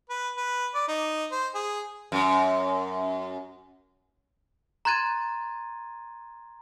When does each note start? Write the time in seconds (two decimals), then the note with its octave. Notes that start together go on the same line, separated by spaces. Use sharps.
0.10 B4
0.37 B4
0.75 D5
0.88 D#4
1.32 C5
1.55 G#4
2.12 F#2
4.85 A#5 C6 F#6 G#6 A6 D#7